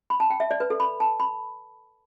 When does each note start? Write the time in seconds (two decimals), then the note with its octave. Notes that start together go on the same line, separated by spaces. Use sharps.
0.10 B5
0.20 A5
0.30 G5
0.40 E5
0.51 D5
0.60 B4
0.70 A4
0.80 B5
1.00 A5
1.20 B5